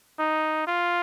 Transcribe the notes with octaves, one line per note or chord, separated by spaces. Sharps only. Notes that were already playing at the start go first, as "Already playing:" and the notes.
D#4
F4